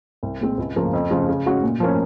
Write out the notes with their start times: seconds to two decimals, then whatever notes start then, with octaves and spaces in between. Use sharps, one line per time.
0.23 C2
0.41 A#2 G#3 C4
0.58 C#2
0.76 C#3 F3 A#3
0.93 F2
1.11 C#3 F3
1.28 C#3
1.46 G#3 C#4 F#4
1.63 A#2
1.80 F3 A#3 C#4